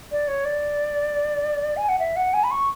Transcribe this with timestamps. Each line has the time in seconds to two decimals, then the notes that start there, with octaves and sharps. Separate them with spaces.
0.11 D5
0.27 C#5
0.45 D5
1.76 G#5
1.88 F#5
1.99 E5
2.16 F#5
2.33 G#5
2.43 B5
2.51 C#6